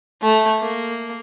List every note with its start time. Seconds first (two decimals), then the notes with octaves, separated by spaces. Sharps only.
0.22 A3
0.60 A#3